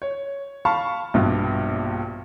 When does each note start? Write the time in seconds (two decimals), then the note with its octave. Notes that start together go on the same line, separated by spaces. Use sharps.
0.02 C#5
0.65 F5 A5 B5 C#6 F6
1.14 A#1 G2 B2